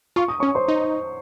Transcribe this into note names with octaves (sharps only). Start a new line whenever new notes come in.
F4 C#6
D#6
C#4 C#5 C#6
C5 C6
D#4